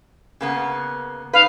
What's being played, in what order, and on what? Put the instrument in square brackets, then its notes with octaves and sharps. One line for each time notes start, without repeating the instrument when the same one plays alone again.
[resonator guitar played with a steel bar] C#3 A#3 B3
[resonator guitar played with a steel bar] D#4 B4 [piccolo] F5